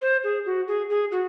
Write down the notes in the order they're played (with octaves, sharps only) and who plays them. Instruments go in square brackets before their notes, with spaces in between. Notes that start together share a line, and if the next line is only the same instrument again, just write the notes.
[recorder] C5
G#4
F#4
G#4
G#4
F#4